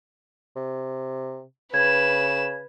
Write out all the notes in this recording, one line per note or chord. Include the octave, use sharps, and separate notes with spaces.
C3
C#3 B4 G#6 E7